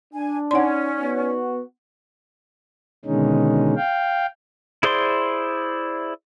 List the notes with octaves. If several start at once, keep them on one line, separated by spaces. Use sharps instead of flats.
D4 G#5
C#4 D#4 D5 F#5 C6
B3 F#4
B2 D3 D#3 G#3 C#4 D#4
F5 G5
E4 G#4 C5 D5 C6